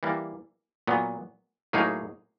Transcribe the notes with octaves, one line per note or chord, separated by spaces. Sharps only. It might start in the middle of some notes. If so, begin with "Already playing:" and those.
E3 G3 A#3
A#2 F#3 B3
A2 F#3 A#3 D#4 G#4